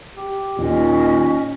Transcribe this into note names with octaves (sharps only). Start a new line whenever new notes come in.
G4
D#2 A#2 C#4 D#5